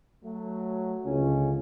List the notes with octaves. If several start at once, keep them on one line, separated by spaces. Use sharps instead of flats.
F#3 A3
C#2 D3 C#4